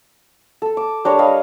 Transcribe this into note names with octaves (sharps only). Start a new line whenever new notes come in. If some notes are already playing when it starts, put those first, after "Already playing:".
A4
D6
G3 D4 A#4 C#5
G3 D#5 F5